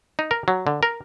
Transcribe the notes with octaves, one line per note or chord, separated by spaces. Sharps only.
D#4
A#4
F#3
D3
A#4